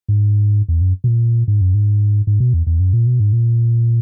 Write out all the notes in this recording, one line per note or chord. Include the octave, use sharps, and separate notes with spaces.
G#2
E2
F#2
B2
A#2
G#2
F#2
G#2
G#2
B2
E2
E2
F#2
A#2
B2
G#2
A#2